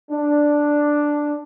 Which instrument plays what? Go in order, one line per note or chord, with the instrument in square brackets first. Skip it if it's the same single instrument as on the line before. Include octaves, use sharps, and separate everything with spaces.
[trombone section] D4